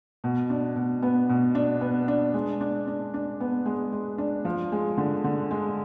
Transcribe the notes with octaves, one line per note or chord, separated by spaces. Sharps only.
B2
D4
B2
B3
B2
D4
B3
D4
G#3
D4
D4
D4
B3
G#3
G#3
D4
F3
G#3
D3
D3
G#3